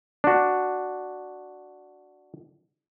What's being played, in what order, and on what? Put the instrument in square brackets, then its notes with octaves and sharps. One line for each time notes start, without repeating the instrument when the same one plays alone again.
[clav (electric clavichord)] D4 F#4